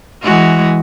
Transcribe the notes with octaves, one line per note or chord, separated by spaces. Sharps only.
E3 G#3 F#4